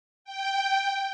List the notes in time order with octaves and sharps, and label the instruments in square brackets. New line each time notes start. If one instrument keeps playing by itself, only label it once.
[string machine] G5